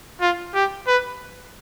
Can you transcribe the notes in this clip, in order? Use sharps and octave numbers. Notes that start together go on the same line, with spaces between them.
F4
G4
B4